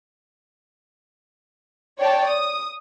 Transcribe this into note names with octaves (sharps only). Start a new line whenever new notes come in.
C#5 D5 G5 A5
D#6